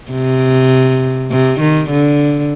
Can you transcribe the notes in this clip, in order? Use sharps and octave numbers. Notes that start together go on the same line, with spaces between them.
C3
C3
D#3
D3